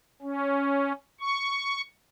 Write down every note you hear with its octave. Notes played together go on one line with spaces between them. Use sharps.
C#4
C#6